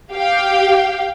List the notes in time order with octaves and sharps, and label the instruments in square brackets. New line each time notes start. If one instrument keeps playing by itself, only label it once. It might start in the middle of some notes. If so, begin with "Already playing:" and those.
[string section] G4 F5 G5